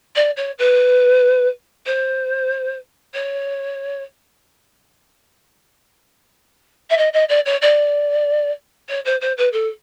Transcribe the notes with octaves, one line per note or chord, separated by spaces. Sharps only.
D5
C#5
B4
C5
C#5
E5
D#5
D#5
D5
C#5
D5
C#5
C5
C5
B4
A4